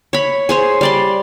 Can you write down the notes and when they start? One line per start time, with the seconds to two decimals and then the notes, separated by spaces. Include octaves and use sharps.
0.13 C#5 B5
0.49 G#4 C5 C#5
0.81 G3 D5 C6